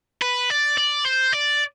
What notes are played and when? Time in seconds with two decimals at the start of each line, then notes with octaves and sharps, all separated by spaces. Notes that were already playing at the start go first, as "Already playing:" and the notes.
0.22 B4
0.50 D5
0.78 D5
1.05 C5
1.33 D5